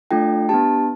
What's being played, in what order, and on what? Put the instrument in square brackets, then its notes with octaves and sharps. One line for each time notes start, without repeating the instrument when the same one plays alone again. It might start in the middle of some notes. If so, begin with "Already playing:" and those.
[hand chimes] A3 D4 F4 A4 G5
B3 D4 G4 A5